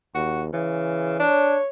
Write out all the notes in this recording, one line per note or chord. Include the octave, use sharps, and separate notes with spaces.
D#2 F#4
C#3 E3
D4 C#5